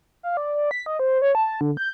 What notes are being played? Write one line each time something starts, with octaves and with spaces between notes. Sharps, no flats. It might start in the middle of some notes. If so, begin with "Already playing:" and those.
F5
D5
B6
D#5
C5
C#5
A5
D3
G6